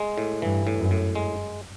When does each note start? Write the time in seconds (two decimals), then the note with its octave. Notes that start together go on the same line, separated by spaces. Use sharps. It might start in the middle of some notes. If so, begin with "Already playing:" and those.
Already playing: G#3
0.18 A2
0.42 G2 E3
0.67 A2
0.79 F#2
0.91 A2
1.15 G#3